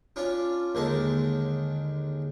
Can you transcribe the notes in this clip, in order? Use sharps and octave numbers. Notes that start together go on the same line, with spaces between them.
C#4 D4 F4
D#2 D3 D#3 G#3 A5